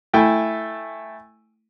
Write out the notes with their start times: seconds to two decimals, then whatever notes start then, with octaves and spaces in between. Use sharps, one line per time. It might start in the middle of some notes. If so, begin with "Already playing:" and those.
0.13 A3 E4 G5 G#5